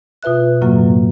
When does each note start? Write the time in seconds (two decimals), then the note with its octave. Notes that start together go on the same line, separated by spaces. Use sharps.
0.23 B2 F4 B4 E5 F#6
0.61 F#2 A2 C#3 F#3 A#3